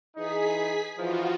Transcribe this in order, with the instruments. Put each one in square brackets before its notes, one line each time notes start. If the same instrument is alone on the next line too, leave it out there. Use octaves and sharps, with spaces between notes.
[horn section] E3 D#4 [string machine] G#4 B6
[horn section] E3 F3 D#4 [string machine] F4 F#4